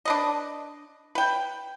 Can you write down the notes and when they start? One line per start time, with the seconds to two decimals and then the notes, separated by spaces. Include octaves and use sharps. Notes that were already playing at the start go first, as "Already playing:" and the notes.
0.05 D4 B4 D#5
1.15 B4 G5